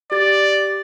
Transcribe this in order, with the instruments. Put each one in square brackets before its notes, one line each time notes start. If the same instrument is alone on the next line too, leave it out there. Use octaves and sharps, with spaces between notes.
[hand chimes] G4 A6 [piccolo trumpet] D5